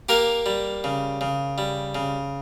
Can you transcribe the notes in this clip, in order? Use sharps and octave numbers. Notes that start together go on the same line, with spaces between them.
A#3 G4 A#4
G3
C#3
C#3
G3
C#3